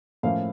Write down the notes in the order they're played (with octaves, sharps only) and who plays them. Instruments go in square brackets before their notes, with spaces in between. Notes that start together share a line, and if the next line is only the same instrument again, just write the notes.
[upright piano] A2 F3 A#3 C#4 F5